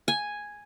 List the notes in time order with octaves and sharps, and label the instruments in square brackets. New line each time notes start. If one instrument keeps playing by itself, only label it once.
[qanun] G#5